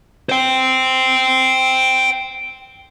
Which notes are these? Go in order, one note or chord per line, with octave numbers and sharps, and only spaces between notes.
C5 G5